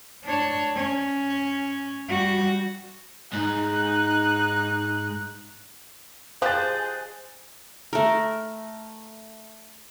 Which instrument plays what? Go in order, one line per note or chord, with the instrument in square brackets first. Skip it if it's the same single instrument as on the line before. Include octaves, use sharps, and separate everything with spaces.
[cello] D4 C#5
C#4
G3 F#4
[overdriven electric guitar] G#2 [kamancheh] D#4 F#6
[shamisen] F3 G4 [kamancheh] G#4 D#5 [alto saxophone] C5 [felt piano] F#6 A6
[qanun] A3 A#4